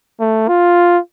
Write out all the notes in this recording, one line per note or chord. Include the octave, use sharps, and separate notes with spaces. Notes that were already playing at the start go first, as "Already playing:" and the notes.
A3
F4